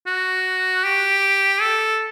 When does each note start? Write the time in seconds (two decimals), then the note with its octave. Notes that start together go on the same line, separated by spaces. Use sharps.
0.07 F#4
0.84 G4
1.61 A4